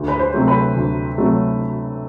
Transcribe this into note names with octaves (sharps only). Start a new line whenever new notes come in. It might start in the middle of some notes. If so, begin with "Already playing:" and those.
Already playing: D2
B4
C5
C3 F#3 A3
B4
D2
C3 F#3 A3